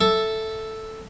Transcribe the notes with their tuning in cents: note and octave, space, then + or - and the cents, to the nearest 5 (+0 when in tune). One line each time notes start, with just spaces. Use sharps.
A4 +0 E5 +0